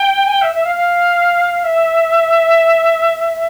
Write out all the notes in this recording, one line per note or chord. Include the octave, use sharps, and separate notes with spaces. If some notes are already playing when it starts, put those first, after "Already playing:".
Already playing: G5
G#5
G5
E5
E5
F5
F5
E5